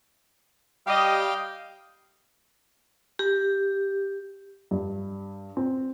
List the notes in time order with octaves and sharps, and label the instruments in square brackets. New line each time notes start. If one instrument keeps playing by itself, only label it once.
[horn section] G3 G4 D#5 [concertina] F5 G5
[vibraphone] G4
[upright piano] G2
C4